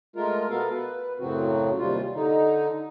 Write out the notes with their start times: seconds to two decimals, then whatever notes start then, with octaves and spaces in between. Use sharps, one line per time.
0.16 G#3 A3 F4 A#4
0.50 B2 B3 A4 A#4 F5
0.72 B4
1.20 F#2 A2 C#3 F#3 C4 F#4
1.77 D#2 C3 G3 F4
2.15 D3 D#4